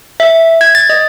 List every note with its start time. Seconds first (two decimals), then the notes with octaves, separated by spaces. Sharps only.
0.20 E5
0.61 G#6
0.75 A6
0.90 D#5